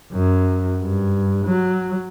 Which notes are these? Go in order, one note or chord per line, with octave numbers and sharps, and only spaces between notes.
F#2
G2
F#3